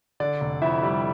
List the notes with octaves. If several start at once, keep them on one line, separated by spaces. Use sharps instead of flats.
D3 D5
F1
F2 E4 E5
G3